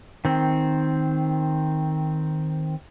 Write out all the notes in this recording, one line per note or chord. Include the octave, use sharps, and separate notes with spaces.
D#3 C4